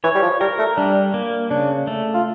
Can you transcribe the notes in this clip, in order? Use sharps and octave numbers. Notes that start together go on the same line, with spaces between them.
E3 C#5
G3
F3
G3 A#4
A3
G3 D4
A#3
C#3 D4
A3
F4